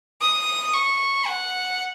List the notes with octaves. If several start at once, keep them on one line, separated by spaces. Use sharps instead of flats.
D#6
C#6
F#5